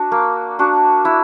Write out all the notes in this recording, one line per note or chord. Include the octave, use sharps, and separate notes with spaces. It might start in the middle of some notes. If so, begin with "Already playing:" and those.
Already playing: D4 F#4
A#3
D4 F#4
E4